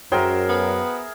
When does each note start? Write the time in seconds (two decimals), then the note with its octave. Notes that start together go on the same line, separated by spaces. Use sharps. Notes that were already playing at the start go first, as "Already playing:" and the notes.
0.12 F#2 F#4 G#4 A#4 C5 E5 G5
0.49 B3